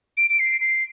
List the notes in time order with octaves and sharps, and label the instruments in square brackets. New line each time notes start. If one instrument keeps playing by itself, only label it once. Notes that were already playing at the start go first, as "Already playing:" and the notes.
[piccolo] D7
D7
C7
C7